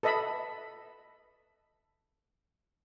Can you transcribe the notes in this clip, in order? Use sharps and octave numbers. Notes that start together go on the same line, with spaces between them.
A4 B4 D#5 E5 B5